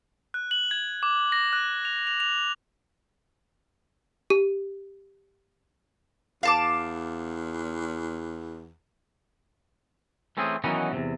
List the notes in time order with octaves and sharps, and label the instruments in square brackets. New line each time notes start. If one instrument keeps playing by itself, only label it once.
[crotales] F#6
F#7
G#6
D6
A#6
F#6
F7
F7
F7
[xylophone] G4
[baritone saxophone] E2 [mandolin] F5 A5 D6
[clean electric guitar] E3 A3 C4 C#4 G#4
D#3 E3 F#3 B3 C#4 D#4
E2 G#2 C3